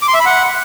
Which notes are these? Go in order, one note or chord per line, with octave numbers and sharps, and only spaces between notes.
D6
C6
E5
B5
F#5